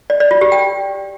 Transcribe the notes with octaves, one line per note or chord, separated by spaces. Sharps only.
D5
D5
F4
G4
G5